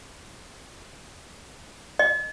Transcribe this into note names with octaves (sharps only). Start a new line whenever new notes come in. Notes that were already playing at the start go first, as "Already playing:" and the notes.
D#5